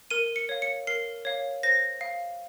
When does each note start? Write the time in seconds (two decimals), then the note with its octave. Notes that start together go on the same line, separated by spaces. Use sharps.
0.10 A#4 D#7
0.36 C#7
0.49 C#5 F5
0.62 C#7
0.87 A#4 C7
1.25 C#5 F5
1.63 C5 A#6
2.01 F5